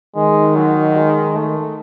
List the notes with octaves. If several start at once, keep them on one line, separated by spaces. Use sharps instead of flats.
D#3 G#3
F#3
G#3
A3